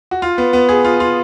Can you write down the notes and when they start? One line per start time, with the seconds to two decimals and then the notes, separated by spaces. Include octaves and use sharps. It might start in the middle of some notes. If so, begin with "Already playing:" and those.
0.11 F#4
0.22 F4
0.38 B3
0.53 B3
0.69 G#4
0.85 F4
1.00 F4